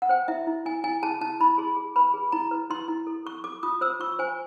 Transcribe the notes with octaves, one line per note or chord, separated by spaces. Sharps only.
F#5
C5 G5
E4 E5
E4
E4 G#5
E4 G#5
G#4 A5
E4 A5
E4 B5
G#4 C6
G#4
B4 B5
G#4
E4 A#5
B4
E4 C6
E4
A4
A4 C#6
A4 D6
F4 D#6
C5 E6
F4 C#6
C5 G#5